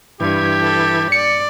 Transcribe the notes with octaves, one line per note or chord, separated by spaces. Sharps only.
G2 E3 E4 G4 G#6
A4
D5 C#7